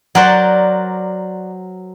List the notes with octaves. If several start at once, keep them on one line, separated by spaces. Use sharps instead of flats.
F#3 A#4 C5 D5 F#5